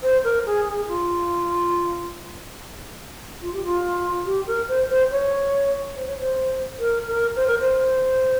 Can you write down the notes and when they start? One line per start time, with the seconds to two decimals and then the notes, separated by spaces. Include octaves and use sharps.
0.03 C5
0.24 A#4
0.46 G#4
0.67 G#4
0.88 F4
3.41 F4
3.53 G4
3.64 F4
4.26 G4
4.47 A#4
4.68 C5
4.89 C5
5.11 C#5
5.95 C5
6.07 C#5
6.19 C5
6.79 A#4
7.07 A#4
7.36 C5
7.47 A#4
7.59 C5